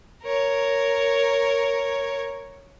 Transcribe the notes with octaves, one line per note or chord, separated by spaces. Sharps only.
A#4 C#5